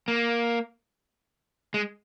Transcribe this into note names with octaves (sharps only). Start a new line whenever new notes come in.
A#3
G#3